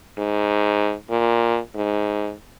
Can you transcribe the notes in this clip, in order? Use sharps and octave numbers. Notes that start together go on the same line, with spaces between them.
G#2
A#2
G#2